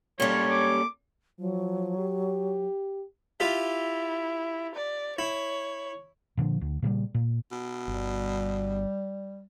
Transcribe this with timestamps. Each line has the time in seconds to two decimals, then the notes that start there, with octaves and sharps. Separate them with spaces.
0.20 G3 A#3 C#4 F4 G4 A4 C#5
0.49 D6
1.39 F3 F#3
1.98 G4
3.40 E4 F4 G4 E5
4.75 D5
5.19 E4 C#5
6.37 A#2 D3 F3
6.61 D2
6.82 A#2 C#3 F#3 G3
7.14 A#2
7.52 B2
7.88 G1 G3